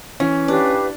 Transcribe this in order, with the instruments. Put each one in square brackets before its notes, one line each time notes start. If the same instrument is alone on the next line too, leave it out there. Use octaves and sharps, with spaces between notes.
[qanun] E3 [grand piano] C#4
[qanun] D4 [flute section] G4 B4 F5